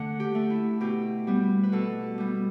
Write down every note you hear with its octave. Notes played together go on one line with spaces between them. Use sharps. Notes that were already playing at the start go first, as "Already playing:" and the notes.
Already playing: D3 A3 F#5
G4
A3
E4
B2 G4
G3 B3
B4
B2 A4
G3 B3